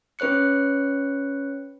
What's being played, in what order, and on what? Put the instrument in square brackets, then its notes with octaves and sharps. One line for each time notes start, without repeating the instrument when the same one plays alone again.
[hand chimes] C#4 B4 C#5 F#6 C#7